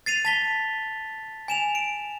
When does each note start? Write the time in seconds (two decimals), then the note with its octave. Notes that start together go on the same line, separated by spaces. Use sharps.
0.06 A6 C7 D#7 F7
0.25 A5 B6 G7
1.48 G#5 E7 F7
1.75 D7